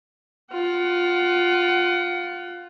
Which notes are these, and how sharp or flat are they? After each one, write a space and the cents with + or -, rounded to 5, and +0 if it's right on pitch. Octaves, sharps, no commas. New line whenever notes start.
F4 +10 F#5 +25